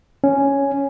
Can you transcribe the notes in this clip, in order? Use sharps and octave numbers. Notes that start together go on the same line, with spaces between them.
C#4